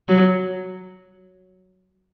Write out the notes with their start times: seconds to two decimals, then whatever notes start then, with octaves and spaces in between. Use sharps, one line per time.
0.09 F#3